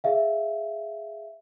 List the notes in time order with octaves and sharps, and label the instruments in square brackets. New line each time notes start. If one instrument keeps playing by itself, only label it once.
[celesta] G#4 E5 F5